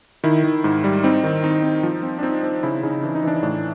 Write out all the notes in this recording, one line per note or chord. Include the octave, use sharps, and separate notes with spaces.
D#3 E4
D#3
G#2
G3
C4 D#4
D#3
C4 D#4
C4
F3
C4
D4
C4 D#4
C4
C#3 E4
C#3 D#4
E3 D4
D#4
E3 D4
A2 D4